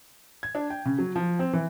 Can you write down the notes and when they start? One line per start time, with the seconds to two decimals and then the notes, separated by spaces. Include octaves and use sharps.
0.43 G#6
0.55 D4
0.70 G5
0.86 C#3
0.99 F#3
1.16 F3
1.39 C4
1.53 E3